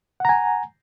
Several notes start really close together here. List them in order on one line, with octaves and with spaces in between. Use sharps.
F#5 A#5 G#5